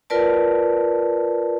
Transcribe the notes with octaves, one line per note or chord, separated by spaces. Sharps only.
F4 A#4 B4 D5 A5